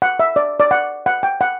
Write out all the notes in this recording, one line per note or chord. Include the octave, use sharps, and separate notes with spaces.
F#5
E5
D5
D5
F#5
F#5
G5
F#5